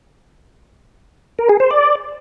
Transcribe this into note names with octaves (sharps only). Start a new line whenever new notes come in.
A#4
G#4
C5
D5